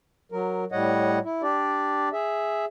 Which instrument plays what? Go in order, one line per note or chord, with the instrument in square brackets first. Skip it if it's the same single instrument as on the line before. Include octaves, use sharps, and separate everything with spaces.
[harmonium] F#3 A#4
A2 G3 C#5 D#5 F#5
E4
D4 G4 D5
G#4 E5